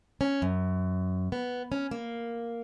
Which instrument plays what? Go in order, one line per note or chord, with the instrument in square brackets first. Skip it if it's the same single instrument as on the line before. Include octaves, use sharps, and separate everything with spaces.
[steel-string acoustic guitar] C#4
F#2
B3
C#4
A#3